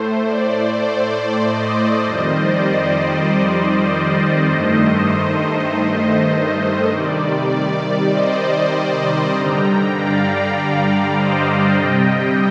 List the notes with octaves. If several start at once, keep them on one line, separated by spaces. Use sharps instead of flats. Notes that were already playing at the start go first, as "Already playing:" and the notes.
Already playing: A2 A3 C5
D5
C5
D5
C5 D#5
F2 D#3 G3 C5 D#5
D5
C5
D5
C5 D#5
G2 D#3 A3
C3 D#3 G3 D5
D5
C5 D#5
G2 D3 G3 G5 A#5
D5 F5
D5
C5 D#5
C3 G3 D#5 G5